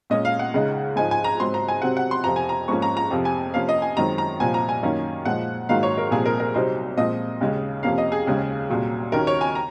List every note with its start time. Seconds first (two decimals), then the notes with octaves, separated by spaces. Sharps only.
0.10 A#2 G#3 C#4 D#5
0.25 F5
0.39 F#5
0.54 C#2 C#3 G#3 D#4
0.96 G#2 F3 G#3 D#4 G#5
1.11 G#5
1.24 A#5
1.40 G#2 F#3 C4 C6
1.54 A#5
1.68 G#5
1.82 C3 F#3 C4 F#5
1.97 F#5
2.11 C6
2.24 F2 C3 F3 A#5
2.36 G#5
2.49 A#5
2.68 G#2 F3 A#3 C#4 C#6
2.82 A#5
2.97 A#5
3.10 F2 C3 F3 C4
3.25 G#5
3.54 C3 F3 A#3 C#4 F5
3.69 D#5
3.82 G#5
3.97 F#2 D#3 G#3 C4 A#5
4.18 A#5
4.40 C2 A#2 F3 G#5
4.54 A#5
4.69 G#5
4.83 F#2 D#3 A#3 C#4
5.25 A#2 F3 G#3 F#5
5.69 G#2 D#3 F#3 A#3 F5
5.83 C#5
5.98 A#4
6.11 C2 A#2 F3 C4 G#4
6.26 A#4
6.40 A#4
6.54 C2 C3 F#3 C4 D#4 C5
6.97 A#2 F3 G#3 C4 D#5
7.41 D#2 C#3 G#3 C#4
7.83 F2 C3 F3 A#3 C#4 F5
7.98 D#5
8.12 G#4
8.27 D#2 C#3 G#3 C#4
8.70 C2 A#2 F#3
9.12 D#2 D#3 F#3 C#4 A#4
9.27 C#5
9.41 G#5
9.55 A#5